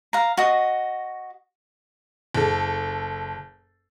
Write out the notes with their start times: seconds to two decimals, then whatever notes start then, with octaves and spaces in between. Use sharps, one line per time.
0.13 F5 A#5
0.37 F#4 D#5
2.35 F#1 A4